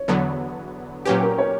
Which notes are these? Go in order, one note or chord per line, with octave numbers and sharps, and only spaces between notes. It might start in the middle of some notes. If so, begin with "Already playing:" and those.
Already playing: C#5
E2 D3 F#3 B3
A#2 F#3 C#4 G4 B4
A#4
C#5